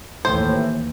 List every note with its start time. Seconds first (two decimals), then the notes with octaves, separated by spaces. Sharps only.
0.25 D#2 A2 E3 C5